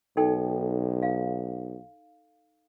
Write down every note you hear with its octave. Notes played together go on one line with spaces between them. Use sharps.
B1 D#4 A4 G5
F5